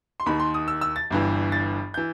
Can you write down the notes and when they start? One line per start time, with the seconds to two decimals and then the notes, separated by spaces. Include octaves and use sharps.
0.20 C6
0.26 D#2 D#3 B5
0.40 C6
0.54 D#6
0.68 E6
0.81 E6
0.96 A6
1.10 G1 G2 E3
1.52 A6
1.94 E3 G6